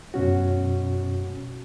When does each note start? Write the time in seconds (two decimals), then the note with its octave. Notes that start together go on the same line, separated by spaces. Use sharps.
0.14 F#2 B2 C#4 F#4